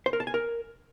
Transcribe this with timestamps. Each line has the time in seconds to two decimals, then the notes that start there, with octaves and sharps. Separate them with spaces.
0.06 C5
0.13 A#4
0.20 A5
0.27 G#5
0.34 A#4